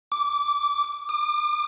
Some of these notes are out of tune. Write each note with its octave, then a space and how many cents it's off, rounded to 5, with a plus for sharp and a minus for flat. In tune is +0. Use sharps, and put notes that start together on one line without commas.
D6 -15
D6 +35